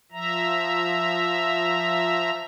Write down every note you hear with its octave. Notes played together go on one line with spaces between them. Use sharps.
F3 E5 A#5